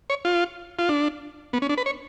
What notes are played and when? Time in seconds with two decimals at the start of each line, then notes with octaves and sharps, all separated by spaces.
0.10 C#5
0.25 F4
0.79 F4
0.89 D4
1.53 B3
1.62 C#4
1.69 D4
1.78 B4
1.86 C#5